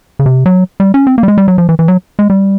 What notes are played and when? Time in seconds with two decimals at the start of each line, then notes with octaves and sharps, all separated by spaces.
0.19 C#3
0.26 C3
0.46 F#3
0.80 G3
0.94 C#4
1.07 C4
1.18 A#3
1.23 G3
1.28 G#3
1.38 G3
1.48 F#3
1.58 F3
1.69 E3
1.79 E3
1.88 F#3
2.19 G#3
2.30 G3